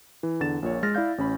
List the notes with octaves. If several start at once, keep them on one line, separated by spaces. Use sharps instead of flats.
E3
E2 D3 A6 E7
A#1 A#2 C#5
G#3 F6 A6 A#6
E4 D5 F5 G6
A1 C#4 B5